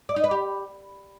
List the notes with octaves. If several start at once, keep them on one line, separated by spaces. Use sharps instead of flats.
D5
D#4
B4
G4